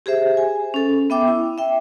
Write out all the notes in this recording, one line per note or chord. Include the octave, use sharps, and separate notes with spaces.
G4 G#4 C5 E5
G#5
C#4 A4
B3 E5 G5 D6
E4
E5 G5